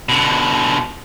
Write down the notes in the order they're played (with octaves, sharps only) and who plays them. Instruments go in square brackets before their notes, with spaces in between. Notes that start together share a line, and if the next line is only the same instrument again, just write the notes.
[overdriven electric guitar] B2 D3